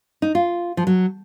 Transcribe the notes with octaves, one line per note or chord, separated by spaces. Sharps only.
D#4
F4
F3
F#3